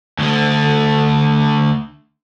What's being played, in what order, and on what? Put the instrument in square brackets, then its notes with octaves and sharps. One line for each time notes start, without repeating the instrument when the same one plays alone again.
[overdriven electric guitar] D2 D3